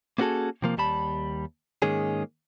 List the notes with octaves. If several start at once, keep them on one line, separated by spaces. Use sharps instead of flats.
A#3 B3 C#4 F#4 G#4 A4
C3 F3 A#3
D#2 G3 A5 B5
G#2 D#3 G#3 A#3 C#4 G#4